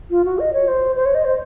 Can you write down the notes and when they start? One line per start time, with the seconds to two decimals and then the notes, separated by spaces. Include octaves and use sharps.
0.10 F4
0.25 F#4
0.39 D#5
0.53 C#5
0.68 C5
0.96 C5
1.05 C#5
1.15 D#5
1.25 C5